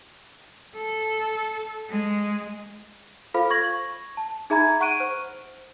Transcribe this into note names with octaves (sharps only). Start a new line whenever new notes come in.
A4
G#3
F4 A4 C5 F5 B5
C#6 G#6 A#6 F#7
A5
D#4 G#4 E5 A#5 B5 G#6
F#5 C#6 F#6 D7 D#7
C5